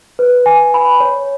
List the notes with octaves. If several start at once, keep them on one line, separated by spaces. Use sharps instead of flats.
B4
G#5
B5
C#5